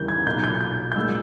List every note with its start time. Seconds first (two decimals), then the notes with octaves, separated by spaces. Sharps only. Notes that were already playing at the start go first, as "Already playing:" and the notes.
Already playing: D#2 C#3 E3 G3 G6
0.08 G#6
0.26 B1 A#2 A#3 G6
0.44 G6
0.61 G6
0.92 G6
0.96 A#2 G#3 E6